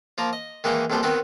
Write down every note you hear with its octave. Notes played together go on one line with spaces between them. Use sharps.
F3 A#3 A#4
D#5
D#3 E3 G#3 A#3 D#4
A#1 F2 B2 G3 C5
D#3 B3 C4 F#4